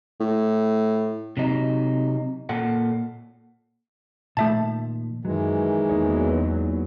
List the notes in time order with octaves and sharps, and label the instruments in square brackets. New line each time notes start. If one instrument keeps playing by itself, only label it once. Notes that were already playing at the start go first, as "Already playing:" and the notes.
[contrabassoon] A2
[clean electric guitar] C3 F#3 D#4
A#2 A4 F#5
[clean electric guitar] A#2 D#3 F3 [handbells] A3 E5 A5
[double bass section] F#2 [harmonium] D#3 E3 G#3 [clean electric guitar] F#3
[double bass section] E2 F#3 [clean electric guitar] A#3 D#4 C#5